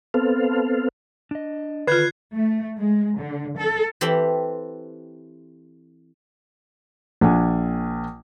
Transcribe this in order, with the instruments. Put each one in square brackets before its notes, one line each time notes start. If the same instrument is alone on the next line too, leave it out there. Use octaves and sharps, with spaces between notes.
[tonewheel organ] B3 C4 A4 F5
[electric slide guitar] D4 D#5
[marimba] D3 D#3 F4 [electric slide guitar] A4 [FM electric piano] B4 [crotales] F#6 G#6 C7
[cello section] A3
G#3
D3
A4
[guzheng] E3 C4 G4 A4 B5 C6
[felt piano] A#1 F#5 G#5